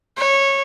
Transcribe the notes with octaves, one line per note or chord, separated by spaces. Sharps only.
C#5